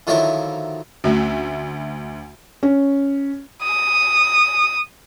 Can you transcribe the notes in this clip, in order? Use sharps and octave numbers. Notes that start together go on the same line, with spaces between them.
D3 D#3 F3 F#3 E4 A#4
D2 A3 C#4 F#4 E5
C#4
D#6